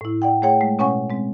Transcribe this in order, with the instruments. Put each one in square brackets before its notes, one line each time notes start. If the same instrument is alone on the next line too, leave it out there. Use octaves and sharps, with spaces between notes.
[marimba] A2 E4
D5 F#5 G5
A3 G#4 C#5 F#5 G5
G#3 A3
B2 C#4 C#5 F#5 G#5 C#6
G#3 C4